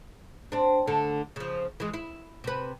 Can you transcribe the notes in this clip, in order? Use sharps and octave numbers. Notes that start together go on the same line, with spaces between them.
C4 D4
D2 D3 A4
C#3 F3
E3 G#3
E4
C3 B4